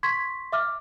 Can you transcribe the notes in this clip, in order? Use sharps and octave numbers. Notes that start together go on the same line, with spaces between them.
C6 C#6 G#6 B6
E5 D6 F6